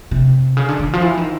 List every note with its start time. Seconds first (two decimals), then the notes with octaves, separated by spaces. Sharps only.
0.11 C3
0.57 C#3
0.69 D3
0.79 D#3
0.93 F3
1.02 E3
1.18 D#3